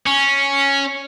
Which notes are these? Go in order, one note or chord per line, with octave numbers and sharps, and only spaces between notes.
C#4